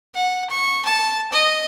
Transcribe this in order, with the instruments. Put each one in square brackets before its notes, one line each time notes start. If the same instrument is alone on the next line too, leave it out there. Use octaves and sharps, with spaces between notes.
[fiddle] F#5
C#6
A5
D#5